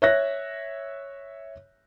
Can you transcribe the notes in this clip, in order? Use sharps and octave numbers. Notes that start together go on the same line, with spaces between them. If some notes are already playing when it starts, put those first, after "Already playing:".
C#5 E5 F#6 A#6